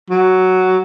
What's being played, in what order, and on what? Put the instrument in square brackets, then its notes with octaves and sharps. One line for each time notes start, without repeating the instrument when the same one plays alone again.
[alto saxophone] F#3